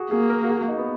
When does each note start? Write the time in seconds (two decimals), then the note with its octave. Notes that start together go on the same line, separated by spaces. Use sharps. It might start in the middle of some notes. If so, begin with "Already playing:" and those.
Already playing: F#4 G#4
0.11 A#3 G#4
0.30 A#4
0.44 F#4
0.49 G#4
0.59 F#4
0.68 D#4
0.77 B3